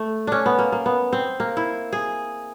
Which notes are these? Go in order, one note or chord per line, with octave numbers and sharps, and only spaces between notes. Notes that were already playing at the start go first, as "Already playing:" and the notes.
Already playing: A3
C#4 D4
B3
A#3
A#3
B3
C4
A#3
E4
G#4